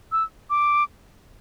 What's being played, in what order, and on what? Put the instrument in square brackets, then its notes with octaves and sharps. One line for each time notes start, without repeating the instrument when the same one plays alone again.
[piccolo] E6
D6